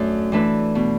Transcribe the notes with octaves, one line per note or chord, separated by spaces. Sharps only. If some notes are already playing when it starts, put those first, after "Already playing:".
Already playing: F#2 A3 D4
E3 A3 D4 B4
B2